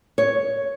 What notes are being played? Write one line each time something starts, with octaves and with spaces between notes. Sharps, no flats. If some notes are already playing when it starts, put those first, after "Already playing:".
C#5